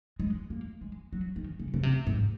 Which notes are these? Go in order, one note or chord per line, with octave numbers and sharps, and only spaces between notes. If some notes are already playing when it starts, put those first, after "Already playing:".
G#3
A#3
G#3
F#3
D#3
C#3
C#3
C3
G#2